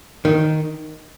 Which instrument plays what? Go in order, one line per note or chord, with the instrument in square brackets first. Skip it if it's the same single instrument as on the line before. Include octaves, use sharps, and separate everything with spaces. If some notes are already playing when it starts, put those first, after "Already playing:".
[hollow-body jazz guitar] D#3